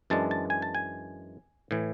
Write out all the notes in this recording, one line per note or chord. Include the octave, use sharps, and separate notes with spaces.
F#2 E3 G#3 D4 A5
A5
G#5
A5
G#5
A2 E3